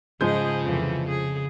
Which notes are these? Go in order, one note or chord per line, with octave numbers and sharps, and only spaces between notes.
G#2 C#3 F3 G#3 G#4 D#5 G6
F2 C3 E3
G#4